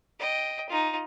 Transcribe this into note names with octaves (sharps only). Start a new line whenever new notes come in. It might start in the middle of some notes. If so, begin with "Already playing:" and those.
D#5 G5
D#4 F4